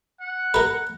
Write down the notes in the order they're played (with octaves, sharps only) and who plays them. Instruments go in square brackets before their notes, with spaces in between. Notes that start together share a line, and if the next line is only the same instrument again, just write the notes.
[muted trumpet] F#5
[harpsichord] A#4 B4